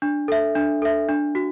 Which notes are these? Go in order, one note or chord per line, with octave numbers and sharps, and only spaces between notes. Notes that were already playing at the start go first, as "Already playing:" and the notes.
D4
A4 E5
D4
A4 E5
D4
F#4